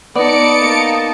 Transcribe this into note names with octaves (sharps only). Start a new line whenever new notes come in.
B3 D#4 D5 A5 C#7 D7
A#3